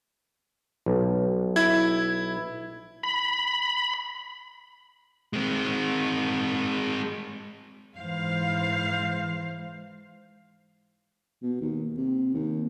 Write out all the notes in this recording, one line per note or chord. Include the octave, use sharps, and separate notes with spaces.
B1
E4 G#6
B5
G#3 C4
G#2 E3 C5 F5
B2
D#2
C3
D#2